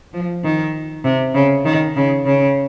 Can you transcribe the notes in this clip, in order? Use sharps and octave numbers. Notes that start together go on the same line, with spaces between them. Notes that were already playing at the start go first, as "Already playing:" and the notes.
F3
D#3
C3
C#3
D#3
C#3
C#3